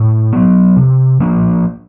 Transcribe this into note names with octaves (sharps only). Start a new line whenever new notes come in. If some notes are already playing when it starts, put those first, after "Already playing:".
Already playing: A2
F#3 B3
C3
F3 A#3 D4